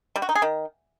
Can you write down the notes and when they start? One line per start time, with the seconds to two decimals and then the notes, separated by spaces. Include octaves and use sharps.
0.16 G3
0.22 F#4
0.29 D#4
0.35 G#4
0.42 D#3